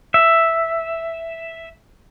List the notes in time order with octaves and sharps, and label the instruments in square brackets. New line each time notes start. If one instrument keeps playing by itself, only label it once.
[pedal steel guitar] E5